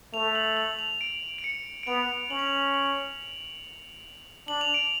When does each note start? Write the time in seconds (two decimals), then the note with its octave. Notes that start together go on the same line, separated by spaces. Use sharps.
0.13 A3 F7
0.35 F#7
0.57 F#7
0.79 F7
1.01 D7
1.38 D7
1.44 C#7
1.83 D7
1.87 B3 F7
2.30 C#4 F#7
2.39 F7
2.47 F#7
2.74 F#7
4.48 D4 F#7
4.61 F7
4.74 D7